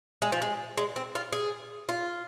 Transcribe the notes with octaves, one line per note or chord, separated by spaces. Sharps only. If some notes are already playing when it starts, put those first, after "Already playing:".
G#3
F3
G#3
G#3
C4
F4
G#4
F4